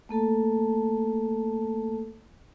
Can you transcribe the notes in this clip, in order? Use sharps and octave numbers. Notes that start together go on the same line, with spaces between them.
A3 A#3 A4 A5